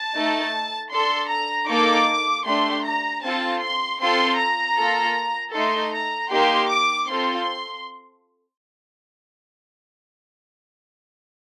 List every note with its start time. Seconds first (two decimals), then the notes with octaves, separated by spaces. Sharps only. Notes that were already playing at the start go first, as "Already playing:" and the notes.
Already playing: A5
0.15 A3 D#4 A4
0.92 D4 A4 C6
1.30 A#5
1.69 A#3 D#4 A4 D6
2.46 A3 D4 G4 C6
2.85 A#5
3.23 C4 F4 A4 A5
3.62 C6
4.01 C4 F4 A4 C6
4.39 A#5
4.78 A#3 F4 A4
5.54 A3 D#4 A4 C6
5.93 A#5
6.32 A#3 D#4 G4 C6
6.70 D6
7.08 C4 F4 A4 C6